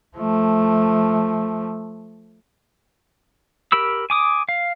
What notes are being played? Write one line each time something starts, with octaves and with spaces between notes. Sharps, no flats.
F3 A3
G4 A#4 B5 E6
G#5 D6 D#6
F5